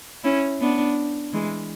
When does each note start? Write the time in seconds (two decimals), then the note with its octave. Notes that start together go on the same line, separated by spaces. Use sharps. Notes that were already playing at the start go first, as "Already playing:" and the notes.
0.24 C#4 E4
0.60 B3 D4
1.33 E3 G#3